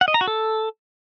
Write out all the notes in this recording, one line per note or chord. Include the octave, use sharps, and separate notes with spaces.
F#5
D#5
A#5
F#4
A4